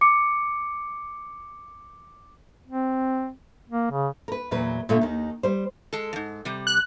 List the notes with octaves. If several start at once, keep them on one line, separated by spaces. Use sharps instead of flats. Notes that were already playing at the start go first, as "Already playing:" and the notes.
D6 C#7
C4
A#3
C#3
A#4 B4
E2 A#2 F#3 B4
A#2 D3 A3
D#2 D#3
G3 C5
G#3 A4
F2 G#2
C3 G3
F#6